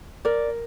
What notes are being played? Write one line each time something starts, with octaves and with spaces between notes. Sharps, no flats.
A#4 D5